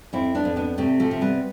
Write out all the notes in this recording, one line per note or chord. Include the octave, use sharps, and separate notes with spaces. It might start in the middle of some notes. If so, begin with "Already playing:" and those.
F2 C4 E4
B3 D4
F2
B3 D4
C3 A3 C4
F3 A3
C3
G3 B3